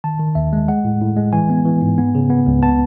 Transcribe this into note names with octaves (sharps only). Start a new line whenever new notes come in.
D#3 A5
D#3
D#2 E5
G#3
G#3 F#5
A2
A2
G#3
E3 G#5
B3
E3
G#2
B3
C#3
B3
C#2
B3 A5